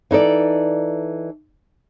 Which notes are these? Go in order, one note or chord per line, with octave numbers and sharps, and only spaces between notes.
E3 D#4 A4 D5